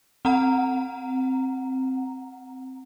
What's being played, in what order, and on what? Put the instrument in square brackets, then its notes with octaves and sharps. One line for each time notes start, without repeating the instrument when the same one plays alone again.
[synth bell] C4 F#5 A#5